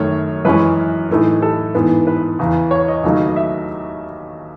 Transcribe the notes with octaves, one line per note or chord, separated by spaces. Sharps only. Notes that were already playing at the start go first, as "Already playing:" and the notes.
Already playing: F#2 D#3 A3 C#5
F#2 E3 G#3 C#4 B4
A2 E3 A3 D#4
A4
G#2 E3 B3
B4
E2 C#3 E3
C#5
D#5
D#2 C#3 F#3 A3 D#4
D#5
E5